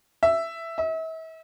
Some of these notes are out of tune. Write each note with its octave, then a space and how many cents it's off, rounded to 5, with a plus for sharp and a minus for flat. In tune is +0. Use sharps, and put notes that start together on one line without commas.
E5 +5
E5 -40